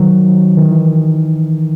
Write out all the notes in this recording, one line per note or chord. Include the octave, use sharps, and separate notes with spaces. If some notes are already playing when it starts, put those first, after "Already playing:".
Already playing: D#3 F#3
D#3
E3